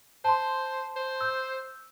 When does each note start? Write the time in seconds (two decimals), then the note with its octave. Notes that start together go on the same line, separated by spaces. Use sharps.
0.25 C5 A5 C6
0.96 C5
1.21 E6 G6